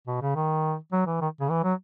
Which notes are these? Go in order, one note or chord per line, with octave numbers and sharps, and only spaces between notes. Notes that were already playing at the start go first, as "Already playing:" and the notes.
B2
C#3
D#3
F#3
E3
D#3
C#3
E3
F#3